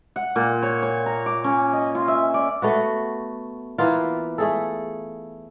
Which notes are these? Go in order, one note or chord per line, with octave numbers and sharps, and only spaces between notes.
F#5
A#2
C#5
C#5
A#5
D6
C#4
D#5
F4
E5
D5
A3 B3 F#4
E3 A#3 B3 F4
A3 G#4 A4